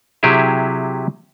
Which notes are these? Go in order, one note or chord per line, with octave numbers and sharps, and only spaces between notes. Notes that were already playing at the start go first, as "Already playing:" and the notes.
C3 F#3 E4 G4 G#4 E5